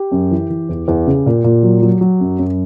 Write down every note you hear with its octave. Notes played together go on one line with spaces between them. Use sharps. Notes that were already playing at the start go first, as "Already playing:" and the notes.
Already playing: G4
F#2
E3
E3
E2
E2
C#3
A#2
A#2
F#3
F#3
F#3
F#2
F#2